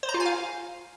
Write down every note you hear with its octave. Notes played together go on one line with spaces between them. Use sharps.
C5
A#5
F4
G#5
F5